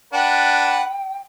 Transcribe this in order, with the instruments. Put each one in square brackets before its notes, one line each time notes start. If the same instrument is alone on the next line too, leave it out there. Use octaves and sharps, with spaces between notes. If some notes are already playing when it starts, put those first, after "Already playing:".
[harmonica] D4 B4 F#5 [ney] G5